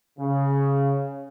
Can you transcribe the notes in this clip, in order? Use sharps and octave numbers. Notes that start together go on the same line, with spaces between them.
C#3